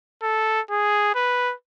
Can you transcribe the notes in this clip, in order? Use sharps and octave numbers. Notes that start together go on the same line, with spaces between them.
A4
G#4
B4